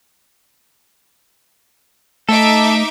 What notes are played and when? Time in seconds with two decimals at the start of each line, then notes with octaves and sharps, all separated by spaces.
2.29 A3 D#4 A4 E5 D6